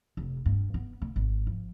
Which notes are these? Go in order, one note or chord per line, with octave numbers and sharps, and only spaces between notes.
F1
G2
B3
D3
G#1
F3